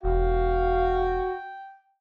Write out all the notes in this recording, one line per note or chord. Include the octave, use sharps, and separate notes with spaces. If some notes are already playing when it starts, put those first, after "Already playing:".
E1 F#4 F5 G5